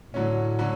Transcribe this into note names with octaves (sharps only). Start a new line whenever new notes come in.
A2 D3 F#3 C#4
D3 F#3 C#4